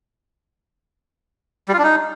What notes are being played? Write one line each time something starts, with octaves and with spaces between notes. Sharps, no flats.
G3
F4
D4
D#4